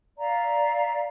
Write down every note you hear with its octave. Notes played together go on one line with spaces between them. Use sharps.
D5 E5 F5 A#5